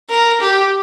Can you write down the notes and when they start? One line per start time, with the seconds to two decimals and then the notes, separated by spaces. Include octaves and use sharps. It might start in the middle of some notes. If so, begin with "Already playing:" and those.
0.10 A#4
0.41 G4